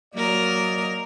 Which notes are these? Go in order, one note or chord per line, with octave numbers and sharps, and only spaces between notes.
F#3 A#3 A#4 D5 D#5